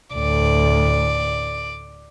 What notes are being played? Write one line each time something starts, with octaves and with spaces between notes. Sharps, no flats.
D2 A2 D5